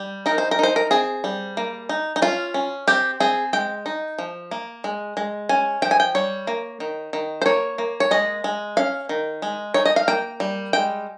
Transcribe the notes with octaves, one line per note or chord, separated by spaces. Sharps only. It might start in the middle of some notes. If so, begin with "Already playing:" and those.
Already playing: G3
D#4 A#4
C5
A#4
D#4 C5
A#4
C4 G#4
G3
A#3
D#4
D#4
C#4 F4
C#4
C4 G4
C4 G#4
G#3 G5
D#4
F3
A#3
G#3
G#3
C#4 G#5
F3 G5
G#5
G5
G3 C#5
A#3
D#3
D#3
C5
A#3 C#5
A#3
C#5
G#3 D#5
G#3
C#4 F5
D#3
G#3
D#4 C#5
D#5
F5
A#3 G5
G3
G#3 G5